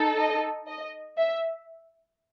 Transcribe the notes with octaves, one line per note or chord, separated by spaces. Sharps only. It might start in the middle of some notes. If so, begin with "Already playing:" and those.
Already playing: D#4 A4
D#5
D#5
E5